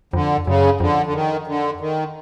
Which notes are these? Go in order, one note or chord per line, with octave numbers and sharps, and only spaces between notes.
F2 D3
F#2 C#3
F2 D3
D3
D#3
D3
D#3